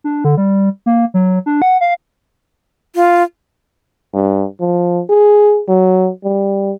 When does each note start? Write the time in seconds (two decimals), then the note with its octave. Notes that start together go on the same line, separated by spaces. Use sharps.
0.04 D4
0.24 D3
0.37 G3
0.86 A#3
1.14 F#3
1.46 D4
1.62 F#5
1.81 F5
2.95 F4
4.14 G2
4.60 F3
5.10 G#4
5.69 F#3
6.24 G3